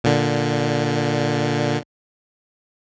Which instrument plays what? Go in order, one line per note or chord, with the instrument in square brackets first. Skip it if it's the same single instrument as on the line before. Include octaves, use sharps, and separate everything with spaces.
[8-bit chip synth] A#2 D3